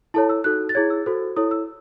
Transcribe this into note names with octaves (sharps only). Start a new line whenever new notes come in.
E4 A4 C#5 A5
E6
D#4 F#4 A4 F#6
A6
E4 G#4 C#5 G#6
E6
F#4 A4 C5
E4 A4 C#5 D#6
E6